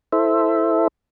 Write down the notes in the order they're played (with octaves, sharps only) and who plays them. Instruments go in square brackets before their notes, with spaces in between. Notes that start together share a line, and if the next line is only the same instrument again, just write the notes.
[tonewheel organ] E4 A4 C5 E5